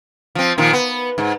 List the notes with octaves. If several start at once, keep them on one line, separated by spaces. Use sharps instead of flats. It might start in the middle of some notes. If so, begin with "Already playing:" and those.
F3 C4
A#2 D#3 F3
B3
G#2